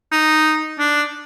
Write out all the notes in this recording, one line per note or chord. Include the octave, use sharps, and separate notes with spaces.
D#4
D4